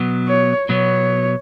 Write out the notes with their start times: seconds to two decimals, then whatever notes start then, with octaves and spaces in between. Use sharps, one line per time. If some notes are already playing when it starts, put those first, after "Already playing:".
Already playing: B2 F#3 B3
0.28 C#5
0.69 B2 F#3 B3 C#5